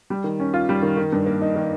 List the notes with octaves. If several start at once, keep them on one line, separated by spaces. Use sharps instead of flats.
G3
D#3
C#4
F4
G3
D#3
D#3
G2
A#3
D#4
D#3